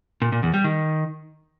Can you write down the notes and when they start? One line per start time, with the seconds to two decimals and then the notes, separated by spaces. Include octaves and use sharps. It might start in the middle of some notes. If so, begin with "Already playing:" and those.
0.22 A#2
0.32 A#2
0.43 E2
0.54 G3
0.64 D#3